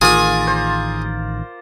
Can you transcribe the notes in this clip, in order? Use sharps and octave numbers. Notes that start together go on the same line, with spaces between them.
A1 A2 D#3 F4 G#4 A#4 D5 G#5
C5